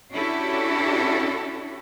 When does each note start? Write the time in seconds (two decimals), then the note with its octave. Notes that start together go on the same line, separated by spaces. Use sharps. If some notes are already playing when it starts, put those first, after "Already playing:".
0.11 C#4 D4 E4 F#4 G4 A4